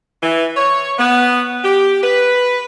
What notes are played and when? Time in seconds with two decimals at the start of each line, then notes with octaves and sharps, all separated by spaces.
0.22 E3
0.57 C#5
0.99 B3
1.64 G4
2.03 B4